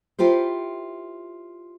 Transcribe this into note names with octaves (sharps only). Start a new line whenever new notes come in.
E4 F4 G4 A#4 C5